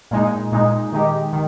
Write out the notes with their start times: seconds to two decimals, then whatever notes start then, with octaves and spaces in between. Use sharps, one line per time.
0.11 A#2 G#3 D#4
0.52 A#2 G#3 D#4
0.92 D#3 G#3 D#4 G4
1.33 D#3